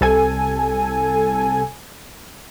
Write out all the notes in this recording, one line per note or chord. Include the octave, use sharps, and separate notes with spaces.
C2 A4 G#5